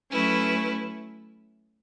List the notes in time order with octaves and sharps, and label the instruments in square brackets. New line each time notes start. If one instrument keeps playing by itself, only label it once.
[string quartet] F#3 A3 C#4 E4 B4